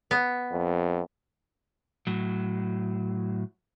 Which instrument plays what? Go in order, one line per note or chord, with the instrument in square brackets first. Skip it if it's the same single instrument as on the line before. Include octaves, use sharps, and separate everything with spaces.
[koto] B3
[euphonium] F2
[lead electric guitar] A2 F#3